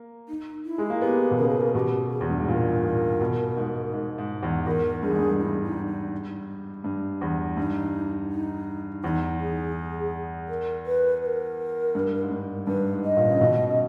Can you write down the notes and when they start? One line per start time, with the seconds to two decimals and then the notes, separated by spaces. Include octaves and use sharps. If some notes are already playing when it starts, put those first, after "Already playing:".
Already playing: A#3
0.29 D#4
0.65 E4
0.78 G#3
0.90 A#3
1.02 B3 G4
1.31 B2
1.38 C#3 A#4
1.49 G#4
1.61 A#4
1.75 B2 G4
2.11 G#4
2.21 E2
2.30 G2
2.38 G#2
2.48 A#2 A#4
2.84 A#2
3.21 B2
3.57 G#2
3.93 G#2
4.18 G#2
4.43 E2
4.66 E2 A#4
5.03 G2 G#4
5.10 G#2
5.18 G2
5.39 G2 E4
5.64 D#4
5.88 D#4
6.84 G2
7.21 E2
7.57 G2 D#4
8.31 D#4
9.03 E2 D#4 E4
9.40 G#4
10.48 A#4
10.86 B4
11.22 B4
11.26 A#4
11.95 G2
12.23 G#2
12.31 G2
12.67 G2 B4
12.92 G#2
13.04 D#5
13.17 A#2
13.31 C#3
13.41 B2